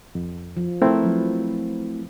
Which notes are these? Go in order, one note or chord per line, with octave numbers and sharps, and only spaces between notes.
F2
F3
A3 C4 E4 A#4 B4
F3 F#3